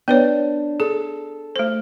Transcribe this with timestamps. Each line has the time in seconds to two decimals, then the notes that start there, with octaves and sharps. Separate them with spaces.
0.08 B3 D4 B4 C#5
0.80 G#4 A4
1.56 A3 C5